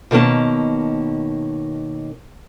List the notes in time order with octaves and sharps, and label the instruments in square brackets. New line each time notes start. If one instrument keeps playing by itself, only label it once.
[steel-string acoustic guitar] B2 D#3 A#3 C#4 A5